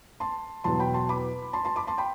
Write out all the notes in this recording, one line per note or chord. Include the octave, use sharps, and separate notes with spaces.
A5 C6
E2 B2 F#3 A5 C6
G5 B5
A5 C6
B5 D6
A5 C6
A5 C6
B5 D6
A5 C6
G5 B5